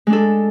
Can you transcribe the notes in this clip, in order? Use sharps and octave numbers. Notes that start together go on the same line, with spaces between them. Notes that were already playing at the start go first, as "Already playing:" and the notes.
G#3 D4 A4